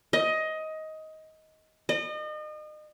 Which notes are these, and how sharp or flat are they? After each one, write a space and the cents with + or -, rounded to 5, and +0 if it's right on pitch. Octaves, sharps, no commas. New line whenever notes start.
D#5 +15
D#5 -35